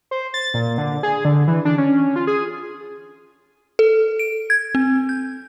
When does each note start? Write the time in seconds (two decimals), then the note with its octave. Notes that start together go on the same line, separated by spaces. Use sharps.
0.11 C5
0.34 A6
0.54 A#2
0.78 D3
1.03 G#4
1.25 D3
1.48 E3
1.65 D4
1.78 C#4
2.16 F4
2.27 G#4
3.79 A4
4.19 D7
4.50 G#6
4.75 C4
5.09 G6